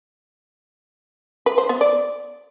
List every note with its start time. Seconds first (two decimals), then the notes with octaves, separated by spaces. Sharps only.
1.46 B4
1.58 C5
1.69 B3
1.81 D5